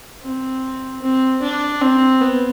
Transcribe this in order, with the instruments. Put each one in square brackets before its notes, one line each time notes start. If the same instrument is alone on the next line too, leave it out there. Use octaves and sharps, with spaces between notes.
[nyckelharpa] C4
C4
D4
C4
B3